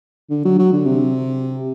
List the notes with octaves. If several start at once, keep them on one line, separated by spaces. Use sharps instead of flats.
D3
F#3
F#3
D3
C3